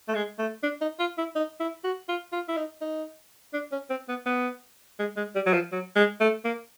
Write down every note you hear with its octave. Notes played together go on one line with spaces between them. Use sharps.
A3
G#3
A3
D4
D#4
F4
E4
D#4
E4
F#4
F4
F4
E4
D#4
D#4
D4
C#4
C4
B3
B3
G#3
G#3
G3
F#3
F3
F#3
G#3
A3
A#3